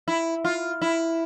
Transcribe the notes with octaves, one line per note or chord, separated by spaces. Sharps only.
E4
F4
E4